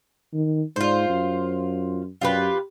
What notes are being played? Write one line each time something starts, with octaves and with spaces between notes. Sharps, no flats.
D#3
G#2 F4 C5
F#2
F#2 F4 G4 B4